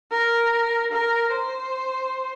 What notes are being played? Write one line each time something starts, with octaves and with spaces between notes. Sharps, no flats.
A#4
A#4
C5